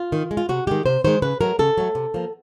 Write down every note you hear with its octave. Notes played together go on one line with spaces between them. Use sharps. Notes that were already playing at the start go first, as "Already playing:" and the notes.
Already playing: F4
D#3
G#3
F4
C3 F#4
D#3 G#3 G4
C3 C5
D#3 G#3 C5
C#3 B4
F#3 A3 A#4
C#3 A4
F#3 A3
C3
F3 A#3